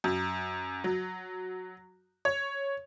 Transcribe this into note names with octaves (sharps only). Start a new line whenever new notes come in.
F#2
F#3
C#5